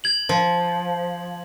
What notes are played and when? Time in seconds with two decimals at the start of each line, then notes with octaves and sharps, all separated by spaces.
0.04 G#6 F#7
0.29 F3